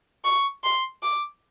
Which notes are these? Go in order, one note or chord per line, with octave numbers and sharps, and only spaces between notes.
C#6
C6
D6